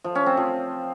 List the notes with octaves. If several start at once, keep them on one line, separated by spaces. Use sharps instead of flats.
F3
C#4
C4
F3